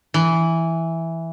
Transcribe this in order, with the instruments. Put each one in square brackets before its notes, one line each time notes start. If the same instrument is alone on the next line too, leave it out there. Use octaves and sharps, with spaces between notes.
[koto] E3